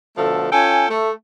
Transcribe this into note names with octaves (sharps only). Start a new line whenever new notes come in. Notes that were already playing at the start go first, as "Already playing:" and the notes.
B2 D3 F3 A3 A4
C#4 F4 A4 G5 G#5
A3